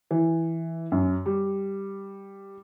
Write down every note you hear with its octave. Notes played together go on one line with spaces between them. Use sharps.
E3
F#2
G3